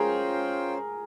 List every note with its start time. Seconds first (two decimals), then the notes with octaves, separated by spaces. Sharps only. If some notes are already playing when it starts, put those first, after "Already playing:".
Already playing: C#4 F4 G#4 A#4 C5 G5